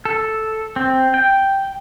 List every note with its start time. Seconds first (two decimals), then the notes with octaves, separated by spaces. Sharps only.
0.05 A4
0.76 C4
1.14 G5